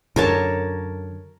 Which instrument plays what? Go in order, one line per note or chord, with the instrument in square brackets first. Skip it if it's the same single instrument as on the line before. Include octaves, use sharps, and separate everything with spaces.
[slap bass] F#2 D3 [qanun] A#4 C#5 A5